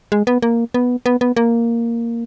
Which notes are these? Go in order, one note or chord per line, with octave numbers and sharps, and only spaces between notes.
G#3
B3
A#3
B3
B3
B3
A#3